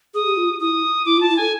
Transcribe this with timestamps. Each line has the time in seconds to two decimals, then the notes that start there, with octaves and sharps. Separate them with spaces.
0.14 G#4 D#6
0.26 G4
0.37 F4
0.60 E4 D#6
1.06 E4 D6
1.17 F4 A5
1.29 E4
1.37 A4 G#5